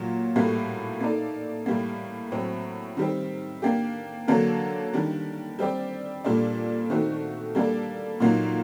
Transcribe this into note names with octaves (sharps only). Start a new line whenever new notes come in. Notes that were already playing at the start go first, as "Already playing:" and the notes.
Already playing: A#2 F#3
A2 G3 A#3 F#4 A4
A#3 D#4 A4 D5
A2 G3 A#3
A2 F#3 C4
D#3 G3 C4
A#3 D4 G4
D3 F#3 A#3 D4 A4
D#3 G3 D4
G3 C4 G4 D5
A#2 G3 D4 A4 D5
D#3 A3 C4 D#4 F#4
G3 A#3 D4 A4 D5
A#2 F#3 A#3 D#4